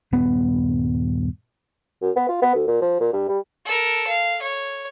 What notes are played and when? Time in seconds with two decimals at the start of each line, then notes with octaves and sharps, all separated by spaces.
0.12 D#1 G2 B3
2.02 F#2
2.16 B3
2.29 F4
2.42 B3
2.55 D2
2.67 A#2
2.81 F3
3.00 A#2
3.13 G2
3.28 G3
3.66 A4 A#4
4.07 F5
4.41 C#5